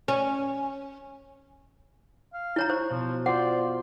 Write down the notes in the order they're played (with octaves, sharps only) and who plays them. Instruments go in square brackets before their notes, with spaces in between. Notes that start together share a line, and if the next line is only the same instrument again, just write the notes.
[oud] C#4
[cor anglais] F5
[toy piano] E4 C#5 A#5
[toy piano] C5 [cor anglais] C#5
[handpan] B2 [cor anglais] F3
[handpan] F4 C5 [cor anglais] D5 [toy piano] F#5